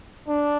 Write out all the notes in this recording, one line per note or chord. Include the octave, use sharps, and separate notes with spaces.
D4